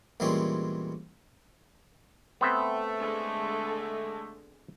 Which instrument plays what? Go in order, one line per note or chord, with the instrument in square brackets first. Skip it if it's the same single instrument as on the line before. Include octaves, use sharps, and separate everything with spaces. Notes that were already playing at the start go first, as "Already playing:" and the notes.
[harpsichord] E2 A#2 G3 G#3 C4 C#4
[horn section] A3 [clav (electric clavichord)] B3 C4 E5
[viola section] D3 G#3